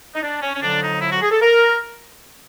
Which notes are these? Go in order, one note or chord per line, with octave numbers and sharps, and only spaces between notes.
D#4
D4
C#4
C#4
F2 D3 F#3 D4
D#4
E4
F#4
G#4
A4
A#4